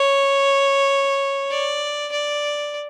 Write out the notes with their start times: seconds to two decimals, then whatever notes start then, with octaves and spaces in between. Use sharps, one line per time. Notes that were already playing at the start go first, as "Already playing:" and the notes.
Already playing: C#5
1.50 D5
2.12 D5